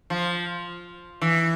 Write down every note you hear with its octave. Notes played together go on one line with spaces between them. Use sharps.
F3
E3